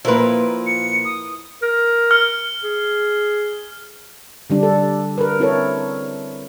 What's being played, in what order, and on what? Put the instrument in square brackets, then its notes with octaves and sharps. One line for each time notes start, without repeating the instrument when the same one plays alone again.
[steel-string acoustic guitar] A#2 F3 [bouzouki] E4 A#4 B4
[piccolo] C#7
D#6
[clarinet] A#4
[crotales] F6
[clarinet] G#4
[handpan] D3 G3 D4
A4
A#4 B4
C4 E4 A4 A#4 C#5